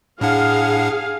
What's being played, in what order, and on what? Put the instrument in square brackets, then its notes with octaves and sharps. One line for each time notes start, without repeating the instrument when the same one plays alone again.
[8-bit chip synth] A2 D4 F#5 [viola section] G#4 F5